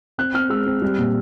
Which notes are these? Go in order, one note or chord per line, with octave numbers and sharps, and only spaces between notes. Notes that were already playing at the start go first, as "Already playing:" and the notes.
C4 F#6
C4 F6
G#3 E6
C4
G3
A#2